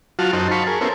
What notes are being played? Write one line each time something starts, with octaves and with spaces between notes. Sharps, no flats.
F#3 F4 F#4 A5 F6
F#2 D#4 F#4 C5 A5
F5 A5 B5 C#6
G#4 A#4
B3 C#4 E4 A4 A#4 C5